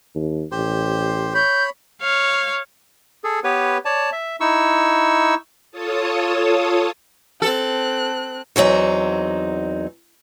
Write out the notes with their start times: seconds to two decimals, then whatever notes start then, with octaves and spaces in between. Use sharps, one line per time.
0.15 D#2
0.52 A1 G4 C5 C6
1.34 C#5 B5 G6
2.02 C#5 F5
3.24 G#4 A4
3.44 B3 G4 B4 C#5
3.85 C#5 D5 A5
4.12 E5
4.41 D#4 E4 C#6 E6
5.71 F4 A4 C#5 A5 D#6
7.42 C4 A4 F#6
8.56 E2 F#3 C4 D#4